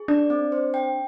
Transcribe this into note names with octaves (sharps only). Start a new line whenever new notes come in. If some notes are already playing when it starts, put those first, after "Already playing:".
Already playing: G#4
D4 D5
C4
C5
G5